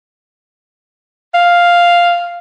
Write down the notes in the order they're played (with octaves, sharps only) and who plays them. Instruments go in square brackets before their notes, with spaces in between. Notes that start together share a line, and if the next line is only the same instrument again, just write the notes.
[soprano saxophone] F5